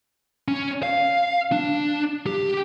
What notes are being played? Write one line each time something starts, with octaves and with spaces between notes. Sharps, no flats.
C#4
F5
D4
G4